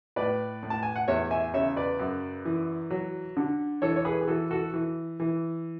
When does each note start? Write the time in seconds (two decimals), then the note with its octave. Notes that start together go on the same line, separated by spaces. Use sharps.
0.16 A2 B4 D5
0.63 A2
0.70 A5
0.83 G#5
0.96 F#5
1.08 E2 C#5 E5
1.31 E5 G#5
1.54 C#3 C#5 E5
1.76 B4 D5
1.99 F#2
2.45 E3
2.90 F#3
3.37 D3
3.82 E3 A4 C#5
3.96 C#5
4.05 G#4 B4
4.21 G#4
4.28 E3 F#4 A4
4.51 F#4 A4
4.74 E3
5.20 E3